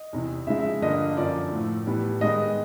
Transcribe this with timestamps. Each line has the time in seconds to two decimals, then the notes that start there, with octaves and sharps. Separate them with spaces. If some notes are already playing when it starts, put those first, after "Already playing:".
Already playing: D#5
0.13 E2 C3 E3
0.47 C#3 F3 G#3 E5
0.59 E5
0.82 G2 D3 F3 A#3 D#5
1.17 F#2 D3 F3 A#3 D5
1.52 A2 F3 A3
1.87 A2 E3 G3 B3
2.21 G#2 D#3 G#3 B3 D#5